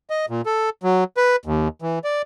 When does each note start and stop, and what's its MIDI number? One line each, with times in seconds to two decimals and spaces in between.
0.10 0.26 75
0.29 0.41 46
0.46 0.70 69
0.83 1.04 54
1.17 1.36 71
1.46 1.68 39
1.82 1.99 52
2.04 2.22 74